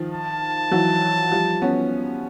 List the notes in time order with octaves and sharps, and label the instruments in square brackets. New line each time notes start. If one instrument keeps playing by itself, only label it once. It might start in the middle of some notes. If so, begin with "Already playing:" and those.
Already playing: [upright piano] D#3 F3
[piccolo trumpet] A5
[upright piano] E3 F#3
F3 G3
B3 C#4